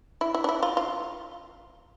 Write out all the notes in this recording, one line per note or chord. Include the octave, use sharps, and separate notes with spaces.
E4
E4
D4
E4
F4
F4